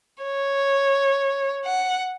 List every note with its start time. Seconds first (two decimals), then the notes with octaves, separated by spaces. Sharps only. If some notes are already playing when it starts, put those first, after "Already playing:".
0.24 C#5
1.65 F#5